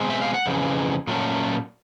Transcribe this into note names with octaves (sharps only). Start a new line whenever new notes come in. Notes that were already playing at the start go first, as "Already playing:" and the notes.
Already playing: B2 G#3 C4
E5
F5
F#5
F2 C#3 E3
A#2 F#3 A3 C#4